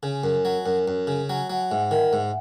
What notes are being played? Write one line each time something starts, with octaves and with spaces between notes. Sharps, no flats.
C#3 G#5
F#2
F#3
F#2
F#2
C#3
F#3 G#5
F#3 F#5
F#5
G#2 E5
D#3
G#2